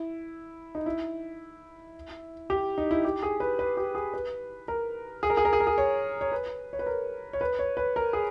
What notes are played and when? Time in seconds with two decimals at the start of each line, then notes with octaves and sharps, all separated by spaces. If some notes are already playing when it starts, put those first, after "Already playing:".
Already playing: E4
0.75 D#4
0.86 E4
2.50 G4
2.78 D#4
2.91 E4
3.05 G4
3.23 G#4
3.40 B4
3.59 B4
3.77 G4
3.95 G#4
4.14 B4
4.68 A#4
5.23 G#4
5.30 A#4
5.37 G#4
5.45 A#4
5.53 G#4
5.60 A#4
5.67 G#4
5.78 C#5
6.21 C#5
6.32 B4
6.73 C#5
6.79 B4
6.86 A#4
7.33 C#5
7.41 B4
7.59 C#5
7.77 B4
7.96 A#4
8.13 G#4